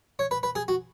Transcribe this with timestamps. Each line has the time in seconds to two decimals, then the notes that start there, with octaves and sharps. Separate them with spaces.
0.19 C#5
0.31 B4
0.43 B4
0.55 G#4
0.68 F#4